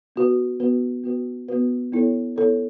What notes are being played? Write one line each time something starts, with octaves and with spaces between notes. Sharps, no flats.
B3 F#4 B4
B3 F#4 B4
B3 F#4 B4
B3 F#4 B4
B3 E4 A4 C#5
B3 E4 A4 C#5